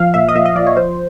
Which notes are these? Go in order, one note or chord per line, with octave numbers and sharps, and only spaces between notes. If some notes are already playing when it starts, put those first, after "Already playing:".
Already playing: F3 F5
A#2 E5
D#5
A#2 E5
D#5
F3 D5
C#5
F3 C5